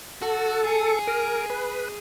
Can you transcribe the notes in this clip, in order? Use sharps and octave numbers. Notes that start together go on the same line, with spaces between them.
F#4 A4
G#4
A#4
B4